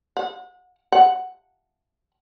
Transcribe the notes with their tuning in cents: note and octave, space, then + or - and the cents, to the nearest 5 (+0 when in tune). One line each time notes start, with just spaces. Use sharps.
F#5 -30
F#5 -5